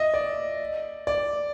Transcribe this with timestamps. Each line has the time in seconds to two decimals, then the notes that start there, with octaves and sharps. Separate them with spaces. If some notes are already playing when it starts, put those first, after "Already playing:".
Already playing: D#5 E5
0.14 D5
1.07 D5